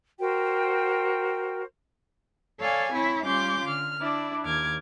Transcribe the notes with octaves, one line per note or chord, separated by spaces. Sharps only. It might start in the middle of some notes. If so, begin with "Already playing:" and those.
F#4 A#4 C5 G5
A4 C#5 D5 F5 G#5
C4 E4 C#5 E5
G3 C#4 F4 C6 D6 G6
D3 F6
D4 E4 D5
D#2 D6 F6 G#6